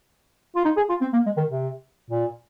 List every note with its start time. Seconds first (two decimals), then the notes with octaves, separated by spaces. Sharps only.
0.56 F4
0.65 D#4
0.77 G#4
0.89 F4
1.01 C4
1.13 A#3
1.26 G#3
1.37 D#3
1.50 C3
2.10 A#2